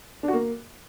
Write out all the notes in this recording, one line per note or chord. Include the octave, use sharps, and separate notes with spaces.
D4
F#4
A#3